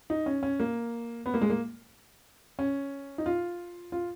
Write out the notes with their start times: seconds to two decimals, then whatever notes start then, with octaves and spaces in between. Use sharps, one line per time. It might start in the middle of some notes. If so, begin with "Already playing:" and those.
0.10 D#4
0.26 C#4
0.43 C#4
0.60 A#3
1.26 B3
1.34 A#3
1.42 G#3
1.50 A#3
2.59 C#4
3.18 D#4
3.26 F4
3.92 F4